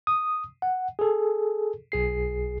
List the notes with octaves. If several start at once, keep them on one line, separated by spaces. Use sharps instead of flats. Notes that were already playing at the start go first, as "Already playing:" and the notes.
D#6
F#5
G#4 A4
B1 G#4 C7